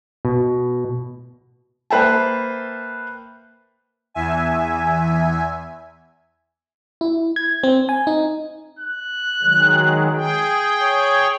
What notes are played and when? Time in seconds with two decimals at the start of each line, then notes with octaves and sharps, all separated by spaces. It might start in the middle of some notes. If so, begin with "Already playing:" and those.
0.25 B2
1.90 A#3 B4 C5 E5 G5 A5
4.14 E2 E5 G#5
7.01 E4
7.36 G#6
7.63 C4
7.89 G#5
8.07 D#4
8.79 F#6
9.43 D#3 F#3 G#3
10.14 G#4 G5
10.81 C#5